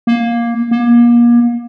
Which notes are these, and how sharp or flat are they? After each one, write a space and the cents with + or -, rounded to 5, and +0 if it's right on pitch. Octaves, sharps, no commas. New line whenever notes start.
A#3 +10
A#3 +35